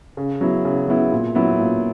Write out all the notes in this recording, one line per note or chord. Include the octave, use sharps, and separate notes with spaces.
C#3
F#3 B3 E4
C#3
F#3 B3 E4
A#2
F#3 B3 E4
A#2